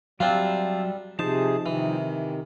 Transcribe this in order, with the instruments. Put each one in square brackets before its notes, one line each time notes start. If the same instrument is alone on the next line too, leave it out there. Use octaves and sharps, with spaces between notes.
[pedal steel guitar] F#3 E5 [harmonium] G3 [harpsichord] C4 D4 F4
[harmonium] C3 G#4 [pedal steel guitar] F3 D#4 C5 [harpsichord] A5
[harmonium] C3 D#3 [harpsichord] E3